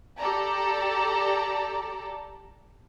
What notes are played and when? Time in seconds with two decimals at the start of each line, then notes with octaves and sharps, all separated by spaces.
0.19 G4 A4 D5 A5 A#5